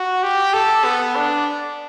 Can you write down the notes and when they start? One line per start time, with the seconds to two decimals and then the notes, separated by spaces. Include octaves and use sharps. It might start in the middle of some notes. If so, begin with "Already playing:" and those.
Already playing: F#4
0.23 G4
0.53 A4
0.84 B3
1.15 D4